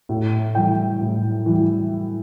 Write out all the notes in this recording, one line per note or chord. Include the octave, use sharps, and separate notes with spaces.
A2
E3 G3 G5
A2
E3 G3